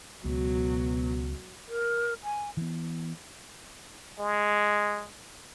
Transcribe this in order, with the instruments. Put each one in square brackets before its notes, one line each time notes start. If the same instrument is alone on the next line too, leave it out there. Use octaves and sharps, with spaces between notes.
[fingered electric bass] C#2 [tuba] B2 [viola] F#3
[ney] A#4
G#5
[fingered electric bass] E3 B3
[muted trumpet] G#3